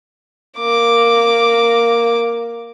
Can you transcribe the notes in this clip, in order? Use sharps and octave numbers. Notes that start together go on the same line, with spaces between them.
A#3 D6